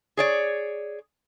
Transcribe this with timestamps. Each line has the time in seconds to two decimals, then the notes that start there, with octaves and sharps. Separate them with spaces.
0.17 G#4 C#5 D5